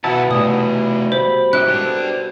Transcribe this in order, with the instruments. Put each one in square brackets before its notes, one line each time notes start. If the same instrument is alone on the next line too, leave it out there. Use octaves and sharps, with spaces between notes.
[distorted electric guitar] C#2 F#5 [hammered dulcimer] B2 F5 [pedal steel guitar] E3 E4 A5
[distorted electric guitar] C3 A3 [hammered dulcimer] G3 [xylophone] D#6
[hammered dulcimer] G3 [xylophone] C5 [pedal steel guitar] B5
[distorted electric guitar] G#2 [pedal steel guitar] C#4 E4 G4 [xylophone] F#6
[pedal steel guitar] D4 G4 A4 [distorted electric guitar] C5 D5